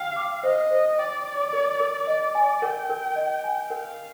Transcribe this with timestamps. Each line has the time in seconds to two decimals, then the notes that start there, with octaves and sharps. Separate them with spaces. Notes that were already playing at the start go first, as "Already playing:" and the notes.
Already playing: F5 G5
0.16 D6
0.43 C5 D#5
0.71 C5
0.98 D5 G5
1.25 D6
1.53 A#4
1.80 A#4
2.07 D5 D#5
2.35 G#5
2.62 A#4 G5
2.90 A#4
3.16 D#5
3.44 G#5
3.70 A#4 F5